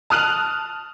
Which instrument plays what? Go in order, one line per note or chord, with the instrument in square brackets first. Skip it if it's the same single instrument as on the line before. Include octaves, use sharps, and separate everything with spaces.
[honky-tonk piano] A5 D#6 F6 F#6 D#7 F#7